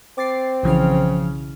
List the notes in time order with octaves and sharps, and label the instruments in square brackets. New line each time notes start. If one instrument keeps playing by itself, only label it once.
[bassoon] C4 [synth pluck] D6 A6 C7
[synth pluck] B1 E3 F6 [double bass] C#3 [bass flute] F3